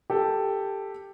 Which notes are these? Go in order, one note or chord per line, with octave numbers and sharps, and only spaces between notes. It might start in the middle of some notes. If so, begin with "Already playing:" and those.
G4 A4